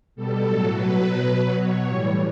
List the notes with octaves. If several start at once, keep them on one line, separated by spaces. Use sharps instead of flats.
B2 G3 A4
A2 F#3
B2 F#3 B4
B2 F#3
B2 F#3
B2 F#3 C#5
A2 E3 G3